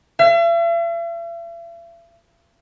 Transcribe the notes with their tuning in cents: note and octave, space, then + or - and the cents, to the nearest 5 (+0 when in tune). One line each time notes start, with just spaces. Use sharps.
E5 +45